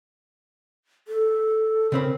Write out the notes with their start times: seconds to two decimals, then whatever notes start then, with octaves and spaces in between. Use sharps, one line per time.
1.08 A4
1.92 C#3 C4 A#4 B5